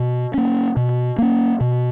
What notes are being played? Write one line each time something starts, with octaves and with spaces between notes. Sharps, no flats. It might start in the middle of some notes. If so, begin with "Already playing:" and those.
Already playing: B2
A#3 C#4
B2
A#3 C#4
B2